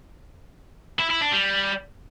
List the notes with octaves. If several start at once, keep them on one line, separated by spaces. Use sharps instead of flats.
E4
E4
D4
G3